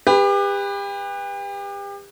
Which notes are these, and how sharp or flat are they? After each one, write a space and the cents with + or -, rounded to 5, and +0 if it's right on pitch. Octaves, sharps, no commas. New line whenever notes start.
G4 +35 B4 +0